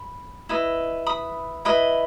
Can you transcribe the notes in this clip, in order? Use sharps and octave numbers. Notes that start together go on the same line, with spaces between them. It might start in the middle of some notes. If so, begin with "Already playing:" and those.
Already playing: B5
E4 B4 D#5
B5 D#6
E4 B4 D#5